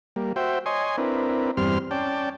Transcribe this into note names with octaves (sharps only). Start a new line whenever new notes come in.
G3 A#3
F#4 C5 E5 G5
C#5 D#5 G#5 C6
C4 D4 E4 A#4 B4
E2 G2 G3 C4 C6 F6
C#4 D5 G5 A5